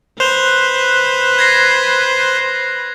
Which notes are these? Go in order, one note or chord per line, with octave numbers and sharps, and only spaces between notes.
B4 C5 F#6 F7 G7
G#6 A#6 C7